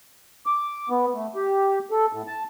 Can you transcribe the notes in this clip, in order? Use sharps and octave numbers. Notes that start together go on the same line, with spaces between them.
D6
B3
A3
G4
A4
A2
A5